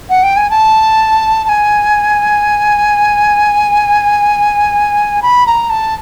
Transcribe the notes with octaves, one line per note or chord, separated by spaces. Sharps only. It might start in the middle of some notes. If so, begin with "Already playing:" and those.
F#5
G5
G#5
A5
A5
G#5
B5
A#5
A5